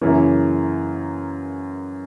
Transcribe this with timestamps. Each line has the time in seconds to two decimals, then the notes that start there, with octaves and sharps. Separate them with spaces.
0.01 F#2 C#3 E3 A#3 C#4